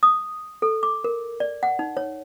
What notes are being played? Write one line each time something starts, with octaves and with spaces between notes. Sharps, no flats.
D#6
A4
D6
A#4
D5
F#5
D#4
C#5